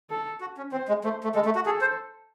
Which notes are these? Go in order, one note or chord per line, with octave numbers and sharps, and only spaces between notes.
A4
F#4
C#4
C4 C5
G#3
A3 C5
A3
G#3 A4
A3
F#4
G#4 A4
C5